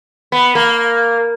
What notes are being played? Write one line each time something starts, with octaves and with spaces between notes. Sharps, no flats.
B3
A#3